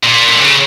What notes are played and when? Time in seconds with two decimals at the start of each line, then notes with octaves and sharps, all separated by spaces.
0.03 A#2
0.28 D3
0.40 C#3